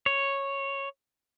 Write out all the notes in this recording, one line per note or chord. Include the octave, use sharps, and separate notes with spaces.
C#5